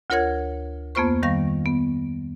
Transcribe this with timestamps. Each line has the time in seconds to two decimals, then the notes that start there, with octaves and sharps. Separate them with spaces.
0.10 D2 F4 A#4 C#5 F#5 G#6
0.95 F2 A#3 B3 F4 C5 C#6
1.23 D#3 G3 F5 C#6 A#6
1.66 B3